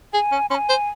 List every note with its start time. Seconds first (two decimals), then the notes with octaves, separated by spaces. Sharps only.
0.14 G#4 G#5
0.32 C#4
0.50 C#4 C6
0.55 G#5
0.69 C5